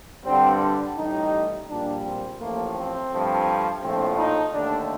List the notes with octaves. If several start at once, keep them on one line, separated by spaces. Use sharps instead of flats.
G2 D3 G3 C4
D4
A1 A2 G3 D#4
A#1 A#2 G3 D4
C4
A1 A2 F3 A3 A#3
C4
G2 F3 A3
A#1 A2 F3 A3 C4
D#4
D#2 D3 A3 D4